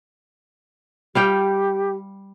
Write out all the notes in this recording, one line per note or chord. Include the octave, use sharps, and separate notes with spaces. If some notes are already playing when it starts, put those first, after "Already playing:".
G3 G4 F5 G5